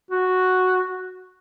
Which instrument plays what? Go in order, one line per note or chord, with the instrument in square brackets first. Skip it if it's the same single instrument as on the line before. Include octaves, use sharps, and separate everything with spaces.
[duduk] F#4